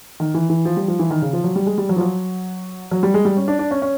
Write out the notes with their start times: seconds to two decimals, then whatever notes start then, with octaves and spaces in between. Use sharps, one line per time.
0.20 D#3
0.35 E3
0.50 E3
0.65 F3
0.77 G3
0.88 F3
0.99 E3
1.10 D#3
1.22 C#3
1.33 F3
1.44 F#3
1.56 G3
1.66 G#3
1.78 G3
1.89 F#3
1.96 F3
2.01 F#3
2.91 F#3
3.03 G3
3.14 G#3
3.25 G3
3.37 C#4
3.48 D4
3.59 D4
3.71 C#4
3.82 C#4